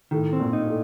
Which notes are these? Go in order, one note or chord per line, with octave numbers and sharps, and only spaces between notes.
A2 D#3
C4
A#2
D#4
A2